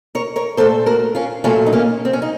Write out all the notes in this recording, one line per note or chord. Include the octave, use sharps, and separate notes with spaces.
A#4 C#5
A#4 C#5
A#2 A3 A4 C5
F#4 A#4
C#4 F4
A#2 F#3 A3 C#4 F4
D#4
A#3 C#4
C4
C#4
D#4